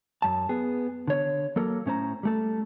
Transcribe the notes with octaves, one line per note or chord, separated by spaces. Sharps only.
F#2 A5
B3 G#4
D3 C#5
F#3 A#3 A4 A#4
A2 C#4 C5 A#5
G3 A3 A4